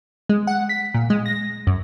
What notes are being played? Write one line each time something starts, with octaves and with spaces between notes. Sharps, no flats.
G#3
F#5
B6
A#2
G#3
A#6
F#2